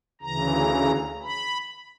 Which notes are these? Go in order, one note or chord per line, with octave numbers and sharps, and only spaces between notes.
D2 C#3 E3 A#5
B5